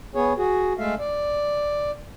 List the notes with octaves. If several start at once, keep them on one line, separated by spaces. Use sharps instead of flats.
B3 G#4 C#5
F#4 G#4
G#3 A3 A4 E5 F5
D5